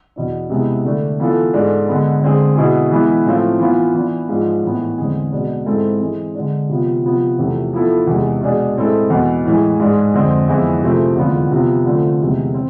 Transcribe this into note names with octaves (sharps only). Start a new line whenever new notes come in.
E2 B2 B3 D4
C3 G#3 B3 E4
D3 A3 D4
E3 B3 F4 A4
G#2 G#3 D4 A4
D3 G#3 B3
D3 G#3 C4 G#4
B2 B3 E4 G#4
E3 G#3 B3 E4
A2 F3 A3 C4 F4
E3 B3 F4
E3 B3 D4
G#2 F3 G#3 D4
A2 E3 B3
E2 D3 G#3 C4 G#4
B2 G#3 B3 D4
G#2 G#3 C4 E4 A4
E3 G#3 C4
D3 G#3 D4
C3 F3 B3 F4
C3 F3 B3 F4
E2 C3 F3 A3
F3 B3 E4 A4
E2 C3 G#3
B2 G#3 D4 G#4
A2 G#3 C4 E4 A4
E2 B2 B3
A2 E3 G#3
G#2 G#3 D4 G#4
F2 D3 G#3 C4 G#4
F2 E3 G#3 B3 E4
C3 F3 A3 C4 G#4
E2 D3 G#3 B3 F4
C3 F3 B3
D3 F3 A3 C4
E2 C3 G#3 B3
C4